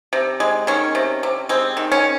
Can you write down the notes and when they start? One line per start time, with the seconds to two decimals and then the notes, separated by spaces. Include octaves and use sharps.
0.13 C3
0.40 G#3
0.67 D#3 C#4
0.95 C3
1.23 C3
1.49 G#3 C4
1.77 D#3
1.92 C#4